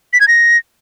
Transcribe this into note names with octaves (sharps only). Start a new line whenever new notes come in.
B6
G#6
A#6